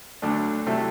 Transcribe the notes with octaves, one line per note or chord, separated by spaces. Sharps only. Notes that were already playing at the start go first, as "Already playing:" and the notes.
D2 D3 F#3 A3 D4
C3 F#3 A3 E4